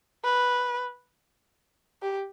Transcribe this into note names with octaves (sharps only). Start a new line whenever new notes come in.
B4
G4